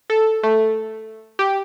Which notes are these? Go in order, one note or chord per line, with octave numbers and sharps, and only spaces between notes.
A4
A3
G4